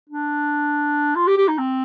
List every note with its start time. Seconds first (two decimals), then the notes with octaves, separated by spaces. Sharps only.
0.10 D4
1.16 F4
1.27 G4
1.38 G4
1.48 D#4
1.58 C4